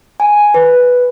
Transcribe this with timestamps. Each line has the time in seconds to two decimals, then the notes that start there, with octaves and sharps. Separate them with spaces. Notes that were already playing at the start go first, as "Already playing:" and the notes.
0.20 G#5
0.54 B4